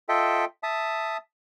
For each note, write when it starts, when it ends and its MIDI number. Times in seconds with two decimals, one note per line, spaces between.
0.09 0.45 65
0.09 0.45 69
0.09 0.45 75
0.09 0.45 76
0.09 0.45 79
0.63 1.17 76
0.63 1.17 81
0.63 1.17 87